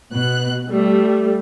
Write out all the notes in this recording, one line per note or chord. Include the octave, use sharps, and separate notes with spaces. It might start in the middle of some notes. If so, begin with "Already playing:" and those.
B2 F#6
G3 A3